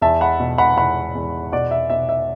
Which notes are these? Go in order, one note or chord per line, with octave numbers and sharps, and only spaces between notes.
E2 E5 A5
F#5 B5
B2
F#5 B5
E2 F#5 B5
E2
B2 D5 F#5
E5
B2 E5
E5